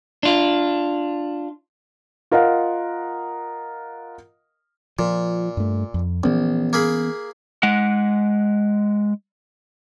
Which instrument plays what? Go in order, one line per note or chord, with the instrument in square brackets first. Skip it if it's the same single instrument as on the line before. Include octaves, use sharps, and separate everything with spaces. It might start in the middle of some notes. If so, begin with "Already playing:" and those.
[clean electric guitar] D4 F4
[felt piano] F4 A#4 D#5 F5 F#5
[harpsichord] A#2 [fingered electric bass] F3
[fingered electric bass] G2 A3
F2
[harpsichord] A#1 [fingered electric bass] E3 B3 C#4
[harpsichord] A#3 G#4 B5
[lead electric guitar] G#3 F#5